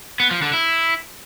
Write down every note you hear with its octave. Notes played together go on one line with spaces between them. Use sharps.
B3
F3
D3
E4